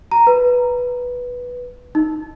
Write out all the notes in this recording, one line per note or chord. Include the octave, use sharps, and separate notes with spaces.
A#5
B4
D#4